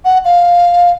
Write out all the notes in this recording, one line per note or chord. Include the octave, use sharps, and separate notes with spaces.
F#5
F5